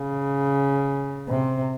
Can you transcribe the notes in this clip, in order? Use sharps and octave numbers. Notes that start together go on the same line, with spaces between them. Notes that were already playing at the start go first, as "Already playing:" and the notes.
Already playing: C#3
C3